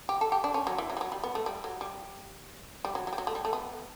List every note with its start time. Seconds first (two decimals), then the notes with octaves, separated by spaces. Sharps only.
0.09 G4
0.21 A4
0.32 G4
0.44 D4
0.54 C#4
0.67 F#3
0.78 E3
0.90 F#3
0.97 G3
1.01 F#3
1.12 G3
1.24 B3
1.35 A3
1.46 G3
1.64 F#3
1.81 G3
2.85 G3
2.95 F#3
3.07 F#3
3.13 G3
3.18 F#3
3.27 A3
3.35 G3
3.45 A3
3.53 B3